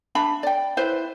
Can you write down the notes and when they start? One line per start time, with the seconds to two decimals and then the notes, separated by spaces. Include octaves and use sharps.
0.15 D4 E5 B5
0.43 D5 G5
0.77 E4 B4 C5